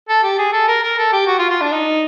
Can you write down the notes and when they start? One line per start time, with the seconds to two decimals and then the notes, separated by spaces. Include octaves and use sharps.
0.09 A4
0.23 G4
0.39 G#4
0.53 A4
0.68 A#4
0.83 A#4
0.98 A4
1.12 G4
1.27 F#4
1.39 F4
1.50 F4
1.61 D4
1.72 D#4